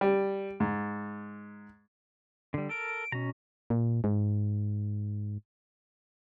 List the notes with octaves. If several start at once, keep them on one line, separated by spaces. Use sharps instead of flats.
G3
G#2
D3 G3
A4 A#4 D7
B2 C#4 A#5
A#2
G#2